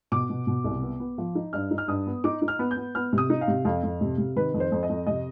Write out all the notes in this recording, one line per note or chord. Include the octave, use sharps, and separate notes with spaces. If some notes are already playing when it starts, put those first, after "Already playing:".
B2 D6
B2
B2
C2
B3
B3
F3
D#4
G2 F6
D#4
F6
G2 D#6
B3
D#4 D6
D#4
F6
B3
G6
B3
B3 F6
C3
D#6
D#4
F5
C3
F2 F5
F2
C3
C3
D#3 B4
F2
C5
F2
D#5
F2
C3 D#5